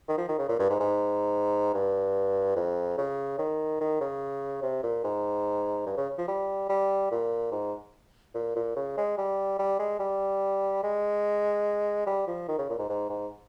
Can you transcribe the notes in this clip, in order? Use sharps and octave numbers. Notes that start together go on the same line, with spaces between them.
D#3
F3
D#3
C#3
A#2
G2
G#2
G#2
G2
F2
C#3
D#3
D#3
C#3
C3
A#2
G#2
G2
C#3
F3
G3
G3
A#2
G#2
A#2
A#2
C#3
G#3
G3
G3
G#3
G3
G#3
G3
F3
D#3
C#3
A#2
G#2
G#2
G#2